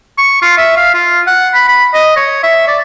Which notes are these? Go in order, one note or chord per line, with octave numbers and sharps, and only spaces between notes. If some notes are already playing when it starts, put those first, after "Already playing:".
C#6
F4
E5
F5
F4
F#5
B5
B5
D#5
C#5
E5
D5